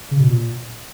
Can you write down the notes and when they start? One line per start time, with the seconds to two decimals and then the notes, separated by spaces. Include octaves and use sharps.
0.11 C#3
0.20 B2
0.28 A#2